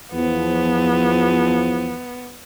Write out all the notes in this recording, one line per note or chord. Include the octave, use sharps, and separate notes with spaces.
E2 F3 B3